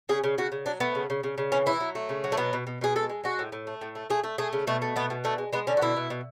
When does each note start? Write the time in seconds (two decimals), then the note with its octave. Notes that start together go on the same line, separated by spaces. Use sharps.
0.09 C#3 G#4
0.24 C#3
0.38 C#3 F#4
0.52 C#3
0.66 F#3 D4
0.80 A3 B3
0.95 C#3
1.10 C#3
1.23 C#3
1.38 C#3
1.52 E3 C#4
1.66 E3 E4
1.80 F#3
1.95 A3
2.09 C#3
2.24 F#3
2.32 A3
2.37 B2 B3
2.53 B2
2.67 B2
2.81 B2 G#4
2.96 G#3 A4
3.10 G#3
3.24 G#3 F#4
3.39 A2
3.52 A2
3.67 A3
3.81 A2
3.95 A3
4.10 A3 G#4
4.24 A3
4.38 A3 G#4
4.53 C#3
4.67 B2 A3
4.82 A3
4.96 B2 B3
5.10 B2
5.24 D3 A3
5.38 G#3
5.53 G#3 B3
5.67 D3 C#4
5.77 F#4
5.81 B2 E4
5.97 B2
6.10 B2